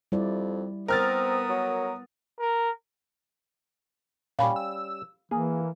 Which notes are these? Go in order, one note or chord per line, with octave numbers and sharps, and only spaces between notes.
F2 G3 E4 D5
B3 C4 A#4 D#6 F6 A6
F#3
A#4
A#2 G3 C#4 F5 B5
E6
E3 A#3 G#4